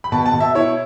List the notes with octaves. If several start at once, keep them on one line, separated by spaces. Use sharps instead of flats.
B5
B2 A5
A5
B2
E5
E4 C#5